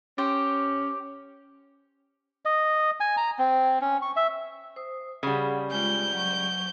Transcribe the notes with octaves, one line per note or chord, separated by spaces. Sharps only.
C#4 G4 C5 G5
D#5
G#5
A#5
C4
C#4
C#6
E5
C5 D#6
C#3 G3 G#4 F#5
G#3 F4 G6
F#3 C#6